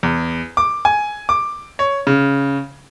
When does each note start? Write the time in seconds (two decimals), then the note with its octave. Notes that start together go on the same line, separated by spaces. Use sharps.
0.03 E2
0.57 D6
0.85 G#5
1.29 D6
1.79 C#5
2.07 C#3